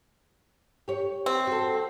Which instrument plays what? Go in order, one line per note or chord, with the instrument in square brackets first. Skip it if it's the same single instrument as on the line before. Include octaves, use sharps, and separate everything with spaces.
[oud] G4 C#5
[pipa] C4
[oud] F#4 A4